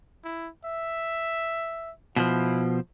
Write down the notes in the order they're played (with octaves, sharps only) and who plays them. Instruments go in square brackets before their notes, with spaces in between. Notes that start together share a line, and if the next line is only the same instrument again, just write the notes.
[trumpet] E4
E5
[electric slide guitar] B2 E3 F3 [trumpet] E4